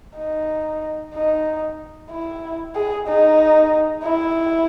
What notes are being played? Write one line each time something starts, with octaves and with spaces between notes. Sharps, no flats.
D#4
D#4
E4
G#4
D#4
E4